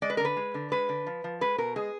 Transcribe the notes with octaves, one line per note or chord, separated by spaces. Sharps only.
G#3 D5
B4
D3 A#4
B4
G#3
D3
G#3 B4
D3
F3
F3
G#3 B4
B2 A#4
G#3 G#4